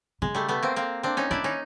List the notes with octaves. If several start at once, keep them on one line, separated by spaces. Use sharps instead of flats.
C#3 G#3
G3 A3
A3 B3
A#3 C4
A#3 C4
C4 D4
C#4 D#4
D#3 D4 E4
C#4 D#4